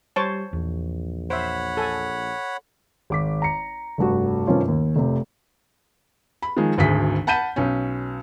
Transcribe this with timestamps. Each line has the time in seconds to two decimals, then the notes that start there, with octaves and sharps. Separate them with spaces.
0.16 G3 C5 C#5 A5
0.53 A#1 E2
1.30 C5 C#5 E5 F#5 B5
1.77 A4 G#5
3.10 G#1 D6 B6
3.42 A#5 C#7
3.98 F1 G2 F#4
4.47 G2 C3 D#3 C4 C#4 F4
4.68 D#2
4.96 F1 C3
6.42 B5
6.57 D#3 F3 G#3
6.78 G#1 D2 G#4 B6
7.27 F#5 A5 B5 G6 B6 D#7
7.56 B1 C#4